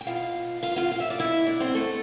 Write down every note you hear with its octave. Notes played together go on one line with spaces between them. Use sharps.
G5
B2 F4 F5
F4 F5
F4 F5
F5
E5
D5
B2 E4 E5
D4 D5
C4 C5
A3 A4